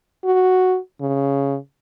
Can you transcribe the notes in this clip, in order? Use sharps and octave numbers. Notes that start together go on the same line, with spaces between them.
F#4
C#3